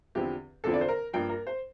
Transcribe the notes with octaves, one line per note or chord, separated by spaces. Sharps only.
E2 D3 F3 C4 E4 G4
E2 D3 F3 C4 E4 A4
D5
C5
A#4
G2 F3 A#3 G5
A#4
C5